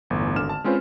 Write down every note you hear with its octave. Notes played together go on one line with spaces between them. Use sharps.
G1 E2 A2
G#1 D3 F6 E7
A5
G#3 C4 C#4 F4 B4 C5